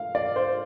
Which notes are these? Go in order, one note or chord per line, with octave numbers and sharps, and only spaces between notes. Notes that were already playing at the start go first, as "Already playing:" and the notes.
Already playing: F5
D5
C5